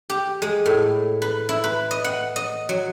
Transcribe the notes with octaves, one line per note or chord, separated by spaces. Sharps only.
G4
G#3
A2
B4
E4
B4
D#5
F#5
D#5
F#3